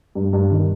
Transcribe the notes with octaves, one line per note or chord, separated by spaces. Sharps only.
G2
G2
D#3